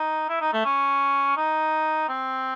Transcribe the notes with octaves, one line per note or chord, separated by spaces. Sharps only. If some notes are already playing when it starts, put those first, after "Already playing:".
Already playing: D#4
E4
D#4
A3
C#4
D#4
C4